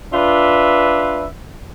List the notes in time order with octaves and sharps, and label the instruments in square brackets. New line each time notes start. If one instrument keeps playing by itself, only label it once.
[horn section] D4 F4 B4 E5